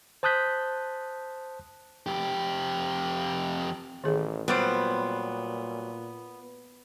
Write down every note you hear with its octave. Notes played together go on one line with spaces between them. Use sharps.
C5 A5 D#6 F#6 G6 B6
F2 G4
A1 D#3 G#4
A#2 F#3 G3 B3 C5